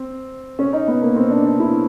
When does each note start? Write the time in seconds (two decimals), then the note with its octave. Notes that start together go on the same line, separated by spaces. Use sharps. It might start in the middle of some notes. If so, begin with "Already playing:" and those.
Already playing: C4
0.59 C#4
0.73 D#4
0.87 B3
1.02 A#3
1.16 C4
1.30 D4
1.45 D4
1.60 E4